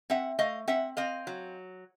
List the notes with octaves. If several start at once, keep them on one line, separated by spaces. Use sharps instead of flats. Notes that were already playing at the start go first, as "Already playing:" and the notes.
C4 E5 F#5
A3 D#5 F5
C4 E5 F#5
C4 D#5 F5
F#3